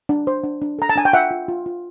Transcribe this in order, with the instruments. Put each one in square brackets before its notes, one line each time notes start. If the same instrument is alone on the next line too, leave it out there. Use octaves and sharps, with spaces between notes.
[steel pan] D4
C5
D4
D4
A4 A#5
A5
D4 G#5
G5
F4 E5 F#5
F4
F4
F4